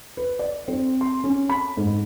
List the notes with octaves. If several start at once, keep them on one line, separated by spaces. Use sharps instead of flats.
B4
D5
C4
C6
C#4
B5
G#2